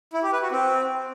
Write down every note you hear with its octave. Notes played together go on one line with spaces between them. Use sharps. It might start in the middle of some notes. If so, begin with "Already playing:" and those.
E4
G4
B4
F#4
C4